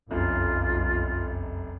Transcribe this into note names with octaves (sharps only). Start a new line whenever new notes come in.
F1 B1 F#2 F4